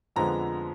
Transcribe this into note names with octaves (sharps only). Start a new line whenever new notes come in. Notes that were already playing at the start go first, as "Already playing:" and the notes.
F2 D3 F3 G#3 B3 A#5